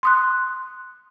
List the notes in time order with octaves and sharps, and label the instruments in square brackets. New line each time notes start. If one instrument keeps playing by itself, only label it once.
[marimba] C6 D#6 F#6